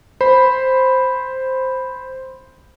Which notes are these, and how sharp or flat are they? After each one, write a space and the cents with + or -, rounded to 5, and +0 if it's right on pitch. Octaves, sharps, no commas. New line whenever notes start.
C5 +0 B5 +0